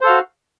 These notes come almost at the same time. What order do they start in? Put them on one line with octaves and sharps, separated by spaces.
C5 A4 F5 F#4